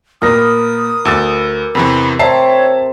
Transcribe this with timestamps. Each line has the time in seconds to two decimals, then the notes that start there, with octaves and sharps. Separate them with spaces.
0.22 A#2 A#4 B4 D#6 A#6
1.05 D2 D6 E6 A6
1.75 E2 C3 E3 B5
2.19 C3 C#5 E5 A5 A#5 C7